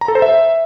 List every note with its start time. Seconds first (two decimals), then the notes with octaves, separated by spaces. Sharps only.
0.01 A#5
0.08 A4
0.15 C5
0.22 E5